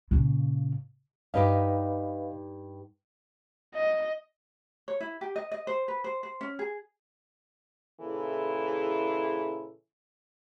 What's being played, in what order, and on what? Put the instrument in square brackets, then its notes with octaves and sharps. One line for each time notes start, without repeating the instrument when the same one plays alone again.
[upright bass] A#2 C#3
[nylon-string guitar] G2 D#4 G4 [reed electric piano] B4 D#5 F5
[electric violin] D#5
[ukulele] C#5
E4
G4
D#5
D#5
C5
B4
C5
C5
C#4
G#4
[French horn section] A#2 C#3 E3 E4 G#4 A4